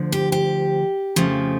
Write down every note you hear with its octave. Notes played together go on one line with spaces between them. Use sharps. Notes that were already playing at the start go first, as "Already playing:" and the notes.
Already playing: D2 D3 F3
G4
G4
F2 C#3 F3 A3